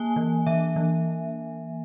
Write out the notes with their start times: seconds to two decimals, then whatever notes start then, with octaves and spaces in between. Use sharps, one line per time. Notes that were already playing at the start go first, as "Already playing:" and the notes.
Already playing: A#3 G#5
0.16 E3
0.47 E3 E5
0.76 E3